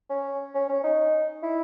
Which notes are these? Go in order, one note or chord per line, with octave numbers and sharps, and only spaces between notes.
C#4
C#4
C#4
D#4
E4